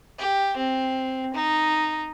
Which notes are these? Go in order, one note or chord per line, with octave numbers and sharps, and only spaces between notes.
G4
C4
D#4